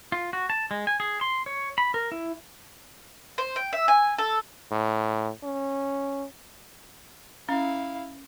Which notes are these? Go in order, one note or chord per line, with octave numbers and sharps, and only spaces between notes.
F4
F#4
A5
G#3
G#5
G#4
C6
C#5
B5
A#4
E4
C5
G5
E5
G#5
A4
A2
C#4
C#4 E4 F5